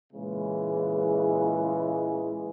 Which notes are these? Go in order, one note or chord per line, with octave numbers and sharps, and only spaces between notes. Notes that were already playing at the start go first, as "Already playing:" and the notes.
A#2 C#3 E3 G#3